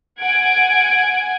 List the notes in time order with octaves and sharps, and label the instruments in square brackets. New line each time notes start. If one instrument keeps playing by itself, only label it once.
[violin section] F#5 G#5 G#6 D7